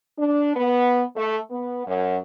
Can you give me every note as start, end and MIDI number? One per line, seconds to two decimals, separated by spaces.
0.18 0.55 62
0.56 1.04 59
1.16 1.38 57
1.51 1.85 59
1.86 2.18 42